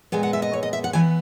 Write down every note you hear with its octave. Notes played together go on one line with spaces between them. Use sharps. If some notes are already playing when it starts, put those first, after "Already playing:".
A#2 G#3 B3 G#5
F#5
E5
D#5
C#5
D#5
E5
F#5
E3 B3 G#5